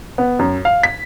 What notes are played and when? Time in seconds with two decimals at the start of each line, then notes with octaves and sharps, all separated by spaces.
0.18 B3
0.39 F#2
0.65 F5
0.83 B6